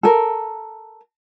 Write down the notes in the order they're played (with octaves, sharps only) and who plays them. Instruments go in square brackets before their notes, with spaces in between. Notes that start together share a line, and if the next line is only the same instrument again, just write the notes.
[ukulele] A4 A#4